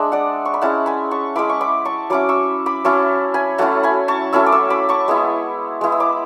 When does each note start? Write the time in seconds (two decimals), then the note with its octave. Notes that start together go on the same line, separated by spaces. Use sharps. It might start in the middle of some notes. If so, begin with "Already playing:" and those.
Already playing: G#3 D4 E5
0.12 D5 F#5
0.45 C#6
0.54 B5
0.62 G#3 C#4 E4 F#5 A5
0.86 G#5 B5
1.11 A5 C#6
1.35 G#3 C#4 E4 B5 D6
1.50 C#6
1.61 B5 D6
1.85 A5 C#6
2.10 F#3 C#4 E4 B5 D6
2.29 C#6 E6
2.66 B5 D6
2.85 F#3 C#4 E4 A5 C#6
3.34 G#5 B5
3.58 F#3 A3 C#4 E4 F#5 A5
3.83 G#5 B5
4.08 A5 C#6
4.33 F#3 A3 C#4 E4 C#6 E6
4.46 D6
4.52 C#6 E6
4.70 B5 D6
4.89 A5 C#6
5.08 G#3 B3 E4
5.81 G#3 B3 E4
5.92 E6
6.00 B5 D6